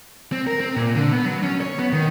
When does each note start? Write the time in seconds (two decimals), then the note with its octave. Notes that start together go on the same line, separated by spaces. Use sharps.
0.32 C4
0.47 A#4
0.60 C4
0.76 A#2
0.95 D3
1.12 B3
1.25 F#3
1.43 C#4
1.61 C#5
1.79 B3
1.93 D#3